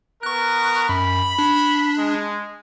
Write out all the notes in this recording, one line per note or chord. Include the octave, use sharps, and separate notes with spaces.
B3 A#4 C#6 F#6
F#2 B5
D4
G#3